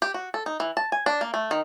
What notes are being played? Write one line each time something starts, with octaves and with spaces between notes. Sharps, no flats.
G4
F#4
A4
D#4
E3
A5
G#5
D4
A#3
A3
D#3